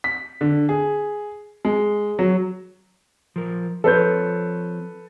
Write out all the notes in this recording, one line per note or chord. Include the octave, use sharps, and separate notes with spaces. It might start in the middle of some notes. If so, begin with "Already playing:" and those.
B6
D3
G#4
G#3
F#3
F3 A#4
F3 C4 A4 B4 C#5 G6